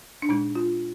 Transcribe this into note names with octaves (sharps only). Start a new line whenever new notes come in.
D4
A#2 G#3 D#4
F4